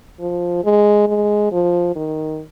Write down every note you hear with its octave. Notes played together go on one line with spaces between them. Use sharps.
F3
G#3
G#3
F3
D#3